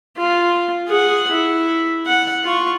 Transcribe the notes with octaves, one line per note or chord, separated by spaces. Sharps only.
F4
G#4 F#5
E4
F#5
F4 C#6